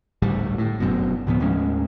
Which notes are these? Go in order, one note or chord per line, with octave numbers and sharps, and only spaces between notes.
G#1 D2 A2 G3
A2
F1 F#2 B2
D2 A2 F3 B3
D#2 A2 G#3 C#4